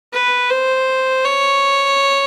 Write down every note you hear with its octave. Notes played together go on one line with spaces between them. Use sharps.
B4
C5
C#5